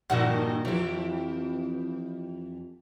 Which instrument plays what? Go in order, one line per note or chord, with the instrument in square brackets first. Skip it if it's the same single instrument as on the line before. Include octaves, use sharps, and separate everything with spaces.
[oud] G2 A#2 D#3 [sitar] D3 F#4 [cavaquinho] F#5
[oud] F2 E3 [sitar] F3 G4